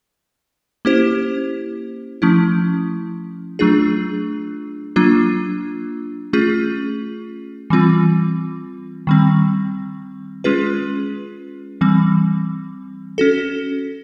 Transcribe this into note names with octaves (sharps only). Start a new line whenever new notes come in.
A#3 C#4 E4 G4 C5
F3 A3 C#4 E4
F#3 A3 D4 F4 G#4
F#3 A#3 D4 F4
A3 C#4 F4 G#4
E3 G3 C4 F4
D#3 G3 C4
G#3 C#4 F4 G#4 B4
E3 G3 C4
C#4 F#4 A4